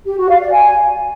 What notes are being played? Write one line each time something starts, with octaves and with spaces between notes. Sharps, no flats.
G4
F#4
F5
D5
G#5